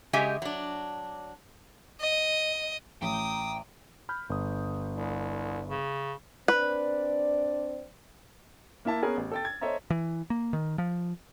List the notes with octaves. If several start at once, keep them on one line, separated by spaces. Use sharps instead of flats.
C#3 G#3 G4 D#5 E5 G#5
F#3 D4
D#5
A1 G5 A#5 D6 D#6
B5 F6 G6
G1 D#6
C2
C#3
C4 D4 B4 D5
A#3 E4 E5 A5
B3 C#4 G#4 A#4
A1
A4 G5 A6
G#6
A4 C5 C#5 D#5 E5 A#5
E3
A#3
D#3
F3